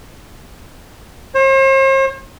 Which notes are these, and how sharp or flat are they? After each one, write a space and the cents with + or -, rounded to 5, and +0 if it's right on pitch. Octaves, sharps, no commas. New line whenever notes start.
C5 +45